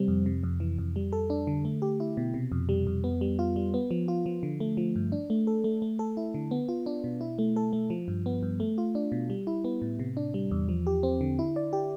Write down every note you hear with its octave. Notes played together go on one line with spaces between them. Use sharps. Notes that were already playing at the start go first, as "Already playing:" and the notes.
Already playing: C3 G3 C4
F2
C3
F2
E3
F2
G3
A4
D4
D3
A3
G4
E4
B2
C3
F2
G3
F2
B3
G3
F4
G3
B3
F3
F4
F3
D3
A3
F3
G2
D4
A3
A4
A3
A3
A4
E4
D3
B3
F4
D4
B2
E4
A3
A4
A3
F3
G2
B3
G2
A3
F4
D4
B2
G3
E4
B3
A2
C3
D4
G3
E2
F3
G4
C4
D3
E4
D5
G4